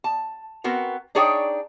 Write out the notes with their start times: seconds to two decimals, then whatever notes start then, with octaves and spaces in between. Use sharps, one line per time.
0.04 A5
0.64 B3 C4 F#4 A#4
1.15 D4 D#4 G#4 C#5 D5 G5